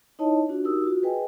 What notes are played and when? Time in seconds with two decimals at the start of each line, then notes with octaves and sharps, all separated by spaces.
0.19 D#4 E4 C#5 D#5 A5
0.49 D4 F4 F#4
0.64 D#4 F#4 G4 A#4 D#6 E6
0.84 F4 F#4
1.02 G#4 B4 D#5 G5 G#5